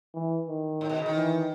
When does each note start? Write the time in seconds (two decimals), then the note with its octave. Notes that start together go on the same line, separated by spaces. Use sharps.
0.14 E3
0.48 D#3
0.81 A2
0.90 B2
0.97 C#3
1.06 D#3
1.15 E3